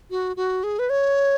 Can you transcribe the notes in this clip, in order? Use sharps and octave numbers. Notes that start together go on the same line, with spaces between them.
F#4
F#4
G#4
B4
C#5